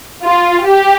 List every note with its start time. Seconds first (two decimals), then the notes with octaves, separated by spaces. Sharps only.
0.24 F4
0.65 G4